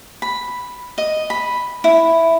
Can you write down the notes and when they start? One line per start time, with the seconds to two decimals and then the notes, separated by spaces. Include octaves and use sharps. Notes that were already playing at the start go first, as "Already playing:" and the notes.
0.22 B5
0.98 D#5
1.30 B5
1.84 E4